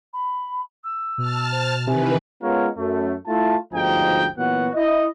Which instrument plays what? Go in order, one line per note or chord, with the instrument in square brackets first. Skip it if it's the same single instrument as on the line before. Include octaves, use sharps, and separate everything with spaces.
[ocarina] B5
E6
[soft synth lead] B2 [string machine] A5 F6
[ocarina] C5
[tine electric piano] C3 [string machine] D#3 E3 B4 [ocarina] G#5
[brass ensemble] G#3 B3 C#4 F4 A#4 C#5
F#2 A3
A3 E4 F4 A5
G1 D2 G#2 F3 D#4 G5
A#2 E3 F#3 B3 F#4 F#5
E4 D#5